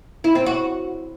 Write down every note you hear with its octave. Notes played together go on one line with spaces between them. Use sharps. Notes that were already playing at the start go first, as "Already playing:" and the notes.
E4
C4
F#4